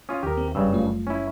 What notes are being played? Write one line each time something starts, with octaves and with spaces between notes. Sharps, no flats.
C#4 F4 D#6
D#2 G4 A#4
C4
F#1 G2 C#3 G3 E6
A3 F4
C#4 E4